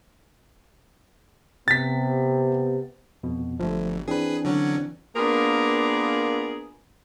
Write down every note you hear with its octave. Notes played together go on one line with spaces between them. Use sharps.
C3 B3 A6 B6
F2 B2
G1 F3 A3
E3 C4 D4 G#4 B4
D3 F#3 C#4
A#3 B3 D4 F4 G#4 A#4